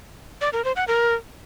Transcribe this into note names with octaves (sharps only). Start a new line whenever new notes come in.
D5
A#4
C5
F#5
A#4